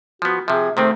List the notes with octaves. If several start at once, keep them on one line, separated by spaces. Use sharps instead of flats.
F3 B3 F#4
C3 F3 G#4 E5
C3 D#3 A3 C4 C5